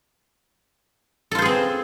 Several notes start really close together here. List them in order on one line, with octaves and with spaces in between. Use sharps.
A4 F4 C5 G#4 C4